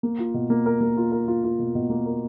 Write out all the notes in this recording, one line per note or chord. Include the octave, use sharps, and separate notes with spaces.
A#3
F4
B2
A#3
A#4
A#3
F4
A#4
F4
F4
B2
B2
A#3
A#4